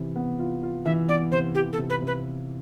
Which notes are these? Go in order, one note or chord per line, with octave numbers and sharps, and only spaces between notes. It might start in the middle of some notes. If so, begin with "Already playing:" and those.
Already playing: C3 E3
B3
F4
F4
E3 E5
B3 D5
C3 C5
E3 G4
A4
C3
B4
C3
B4